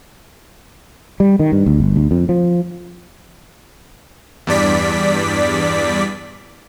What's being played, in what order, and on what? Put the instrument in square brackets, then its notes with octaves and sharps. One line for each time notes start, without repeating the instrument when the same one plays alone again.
[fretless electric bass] G3
D#3
G2
D2
G1
D2
F2
F3
[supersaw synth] E2 G2 D5 B6